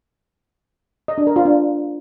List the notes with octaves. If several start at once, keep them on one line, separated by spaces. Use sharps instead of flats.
D#5
D4
A#4
F4
D4